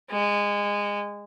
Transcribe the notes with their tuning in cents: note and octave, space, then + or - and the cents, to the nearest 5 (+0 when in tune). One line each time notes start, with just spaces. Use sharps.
G#3 -20